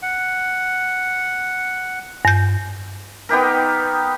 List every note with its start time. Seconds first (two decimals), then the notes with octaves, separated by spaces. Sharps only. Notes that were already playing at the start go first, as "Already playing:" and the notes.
0.02 F#5
2.25 G2 G6
3.29 B3 D#4 G4 A#4